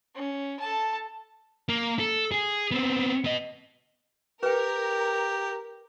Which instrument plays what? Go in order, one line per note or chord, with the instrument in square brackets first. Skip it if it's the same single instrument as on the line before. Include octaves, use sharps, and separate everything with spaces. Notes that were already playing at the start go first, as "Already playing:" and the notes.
[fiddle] C#4
A4 A5
[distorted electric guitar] A#3
A4
G#4
B3 C4
B3 D#5
[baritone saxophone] G4 [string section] A#4 [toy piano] B4 G5